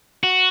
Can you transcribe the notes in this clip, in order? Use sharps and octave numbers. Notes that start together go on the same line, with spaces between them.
F#4